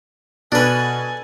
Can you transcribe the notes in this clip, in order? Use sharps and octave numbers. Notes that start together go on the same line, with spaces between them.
B2 D4 A4 B4 G#5